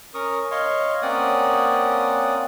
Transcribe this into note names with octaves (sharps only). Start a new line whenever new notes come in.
C#4 A#4 C#6 D#6
C#5 D#5 F5 C6 C#6
A#3 C4 C#4 D5 F#5 D#6